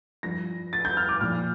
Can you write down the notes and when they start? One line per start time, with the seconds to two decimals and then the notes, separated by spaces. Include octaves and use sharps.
0.23 G2 F3 A#6
0.73 A6
0.85 G6
0.97 F6
1.09 D6
1.21 A#2 F3 F6